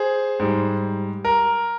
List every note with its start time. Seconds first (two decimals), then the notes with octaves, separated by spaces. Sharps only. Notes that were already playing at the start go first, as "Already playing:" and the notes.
Already playing: G#4 C5
0.40 G#2 G3
1.25 A#4